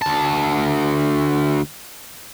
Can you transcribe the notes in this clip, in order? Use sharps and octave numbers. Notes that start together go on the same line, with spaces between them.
D2 A5